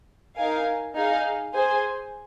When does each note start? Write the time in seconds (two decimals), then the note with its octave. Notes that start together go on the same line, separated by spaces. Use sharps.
0.36 D#4 A#4 F5 G#5
0.95 D#4 G#4 F5 G#5
1.53 G#4 C5 G#5